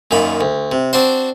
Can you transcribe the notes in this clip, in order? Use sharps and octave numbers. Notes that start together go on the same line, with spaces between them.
F#2 A#2 D#3 B5
D2
C3
C4 D4 F#4 C5